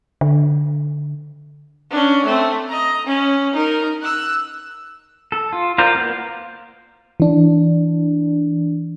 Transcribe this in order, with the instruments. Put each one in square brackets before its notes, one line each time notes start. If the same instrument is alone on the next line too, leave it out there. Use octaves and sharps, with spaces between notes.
[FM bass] D3
[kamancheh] C#4 D4
A3 C4
D#5 A#5
C#4
D#4 A#4
E6 F#6
[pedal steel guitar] A4
F4
F4 A#4 C5 D5
A#3 B3
[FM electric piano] E3 D4